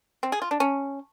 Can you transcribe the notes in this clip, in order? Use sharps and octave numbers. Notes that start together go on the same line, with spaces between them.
C4
G#4
F4
D4
C#4